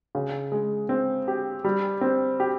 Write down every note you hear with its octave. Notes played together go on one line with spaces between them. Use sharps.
C#3
G#3
C4
G4
G3
C4
G4